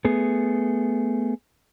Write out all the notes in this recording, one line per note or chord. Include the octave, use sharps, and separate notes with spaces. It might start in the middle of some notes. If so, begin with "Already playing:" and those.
A3 B3 G#4